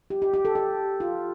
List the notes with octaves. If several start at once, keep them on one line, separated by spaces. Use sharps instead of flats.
G4
G4
G4
A4
G4
F4